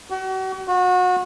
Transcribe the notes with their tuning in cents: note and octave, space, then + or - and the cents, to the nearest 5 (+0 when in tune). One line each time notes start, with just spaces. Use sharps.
F#4 +40
F#4 -30